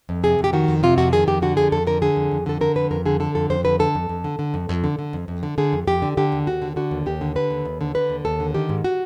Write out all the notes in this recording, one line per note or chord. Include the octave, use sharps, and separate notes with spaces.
F2
C3 G#4
F2
G4
D#3 F#4
F2
C3 F4
F2 F#4
D#3 G#4
F2 G4
D3 F#4
F2 G#4
F2 A4
D3 A#4
D3 G#4
F2
F2
D3 A4
D3 A#4
F2 B4
F2 A#4
D3 G#4
D3 A4
F2 A4
F2 C5
D3 B4
D3 A4
F2
F2
D3
D3
F2
F2
D3
D3
F2
F2
D3
D3 G#4
F2
F2 G4
D3
D3 G4
D#2
D#2 F#4
D3
D3 F#4
D#2
D#2 G4
D3
D3 B4
D#2
D#2
D3
D3 B4
D#2
D#2 A4
D3
D#3 G4
G#2
F#4